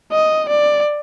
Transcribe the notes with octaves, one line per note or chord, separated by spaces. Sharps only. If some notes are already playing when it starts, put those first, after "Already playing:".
D#5
D5